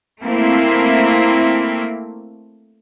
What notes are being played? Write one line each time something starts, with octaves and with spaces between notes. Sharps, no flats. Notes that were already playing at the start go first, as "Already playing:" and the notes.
A3 A#3 C4 E4